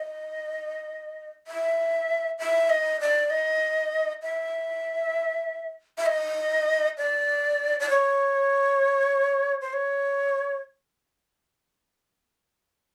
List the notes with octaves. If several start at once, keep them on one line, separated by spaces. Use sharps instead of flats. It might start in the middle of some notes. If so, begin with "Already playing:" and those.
Already playing: D#5
E5
E5
D#5
D5
D#5
E5
E5
D#5
D5
D5
C#5
C5
C#5